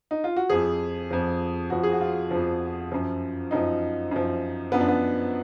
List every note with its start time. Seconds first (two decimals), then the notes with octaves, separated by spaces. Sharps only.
0.11 D#4
0.24 F4
0.36 F#4
0.49 F2 F3 G#4
1.11 F2 F3
1.70 F2 F3 F#4
1.83 G#4
1.92 F#4
2.01 F4
2.31 F2 F3
2.92 F#2 F3
3.51 F#2 F3 D#4
4.11 F#2 F3
4.72 F#2 F3 B3
4.80 D4
4.88 B3